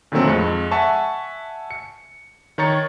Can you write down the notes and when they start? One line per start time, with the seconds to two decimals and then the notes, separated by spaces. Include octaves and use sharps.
0.12 A#2 D3 D#3 F#3 A3 C4
0.27 F2 G#3 C#7
0.71 E5 F#5 G#5 A5 C#6
1.71 C#7
2.58 D#3 C#5 A#5 A6 C#7